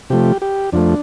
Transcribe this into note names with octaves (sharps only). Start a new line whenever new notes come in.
C3 F3 A3 G4
G4
F2 F3 A3 D4